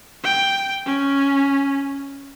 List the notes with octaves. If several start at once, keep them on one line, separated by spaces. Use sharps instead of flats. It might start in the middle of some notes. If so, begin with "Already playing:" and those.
G5
C#4